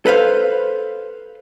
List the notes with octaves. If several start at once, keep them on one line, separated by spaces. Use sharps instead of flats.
A4 B4 C5 F5